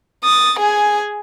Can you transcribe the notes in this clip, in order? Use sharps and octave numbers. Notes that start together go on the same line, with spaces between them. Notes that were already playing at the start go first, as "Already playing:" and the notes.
D#6 A6
G#4 G#5